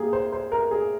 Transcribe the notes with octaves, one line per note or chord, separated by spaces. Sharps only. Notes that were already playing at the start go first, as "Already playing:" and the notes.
Already playing: A#3 G4 G#4
C5
C5
A#4
G#4